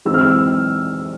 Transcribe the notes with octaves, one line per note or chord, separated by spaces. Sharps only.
E3 G#3 C4 D#4 E6
F6
E6